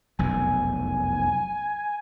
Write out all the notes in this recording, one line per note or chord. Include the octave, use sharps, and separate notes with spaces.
F1 B1 F#2 G#5